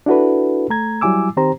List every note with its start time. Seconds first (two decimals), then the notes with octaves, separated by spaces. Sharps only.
0.06 D4 E4 F#4 A4 B4
0.70 A3 A#5 G#6
1.01 F#3 G3 E4 G#5 D6 E6
1.37 D#3 C4 G4 C5 A#5